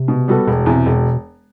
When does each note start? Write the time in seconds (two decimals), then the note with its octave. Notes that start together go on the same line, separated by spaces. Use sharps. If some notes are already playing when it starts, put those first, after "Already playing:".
Already playing: C3
0.08 B2
0.28 G3 B3 F#4 A4
0.47 E1 B2
0.66 E2 C3
0.86 E1